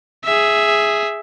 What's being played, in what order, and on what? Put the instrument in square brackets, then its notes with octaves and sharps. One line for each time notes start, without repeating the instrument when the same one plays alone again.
[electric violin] G#4 E5